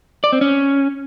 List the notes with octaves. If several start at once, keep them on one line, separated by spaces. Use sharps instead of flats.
D5
C4
C#4